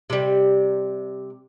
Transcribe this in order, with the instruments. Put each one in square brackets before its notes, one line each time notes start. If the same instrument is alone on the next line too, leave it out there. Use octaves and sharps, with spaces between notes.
[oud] C3 G3